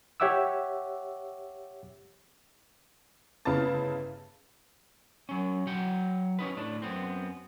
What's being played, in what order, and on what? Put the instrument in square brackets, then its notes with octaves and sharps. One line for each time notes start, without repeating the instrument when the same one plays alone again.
[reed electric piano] G4 C#5 E5 F#5 D6 E6
[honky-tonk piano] G1 C#3 E4 F5 A5 A6
[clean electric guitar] F#3 C#4
F#3 F#5 G5
C#4 D#4 B4
A2 D4
F#2 B3 C4